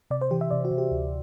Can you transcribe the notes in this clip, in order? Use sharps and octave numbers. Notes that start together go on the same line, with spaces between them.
C3 D5
C5
E3 G4
E5
C3 D5
F#4
C3
G4
D2